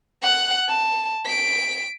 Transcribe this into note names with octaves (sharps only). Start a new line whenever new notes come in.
F#5 F#6
A5
B6 D7